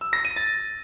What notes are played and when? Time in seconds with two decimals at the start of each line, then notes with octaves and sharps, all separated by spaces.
0.01 E6
0.13 A#6
0.25 D#7
0.36 A6